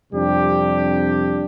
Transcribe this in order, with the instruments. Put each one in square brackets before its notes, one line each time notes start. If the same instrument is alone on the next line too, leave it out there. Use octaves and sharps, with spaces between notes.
[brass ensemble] F2 C3 G3 D4 G4